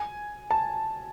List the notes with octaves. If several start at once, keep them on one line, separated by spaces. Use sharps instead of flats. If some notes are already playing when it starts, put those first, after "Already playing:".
Already playing: G#5
A5